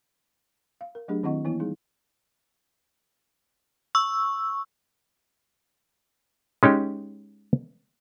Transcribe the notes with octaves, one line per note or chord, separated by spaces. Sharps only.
F5
A#4
F#3 A3 D4 G4 G#4
D#3 C4 E4 D#5 F#5 C#6
E3 A#3 B3 E4
G3 D#4 G#4
C#6 E6
G#3 C#4 D#4 G4